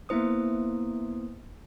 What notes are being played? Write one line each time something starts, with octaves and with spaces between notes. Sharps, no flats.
A#3 B3 E4 C5 D#6